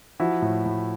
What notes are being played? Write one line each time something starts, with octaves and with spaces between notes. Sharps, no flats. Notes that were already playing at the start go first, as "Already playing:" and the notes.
F3 E4 F#4
A2
A2